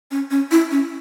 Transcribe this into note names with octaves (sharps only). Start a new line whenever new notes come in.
C#4
C#4
E4
C#4